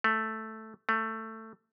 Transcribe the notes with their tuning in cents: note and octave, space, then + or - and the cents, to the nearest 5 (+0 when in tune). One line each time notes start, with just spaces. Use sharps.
A3 +0
A3 +15